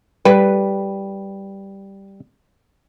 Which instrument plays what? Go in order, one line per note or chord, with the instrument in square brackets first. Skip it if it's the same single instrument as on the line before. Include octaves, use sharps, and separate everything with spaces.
[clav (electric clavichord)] G3 [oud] B4